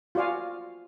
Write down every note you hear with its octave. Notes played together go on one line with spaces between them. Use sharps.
F4 F#4 D5 F5 G#5